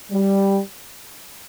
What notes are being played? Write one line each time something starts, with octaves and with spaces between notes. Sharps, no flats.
G3